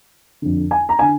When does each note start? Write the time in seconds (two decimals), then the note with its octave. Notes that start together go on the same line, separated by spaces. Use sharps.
0.42 F2 D3
0.71 G#5
0.89 A#5
0.99 D3 G#5